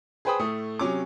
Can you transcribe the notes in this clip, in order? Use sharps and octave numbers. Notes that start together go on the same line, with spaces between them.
G#4 B4 C5 G5 B5 D#6
A2 A3 D#6
C3 F#3 C#4 D6